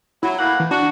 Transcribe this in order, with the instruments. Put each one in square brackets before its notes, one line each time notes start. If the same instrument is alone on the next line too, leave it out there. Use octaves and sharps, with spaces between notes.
[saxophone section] F#3 [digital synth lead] E4
[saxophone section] A2 A#3 F#5
[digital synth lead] E3
[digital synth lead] D4 [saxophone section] F#4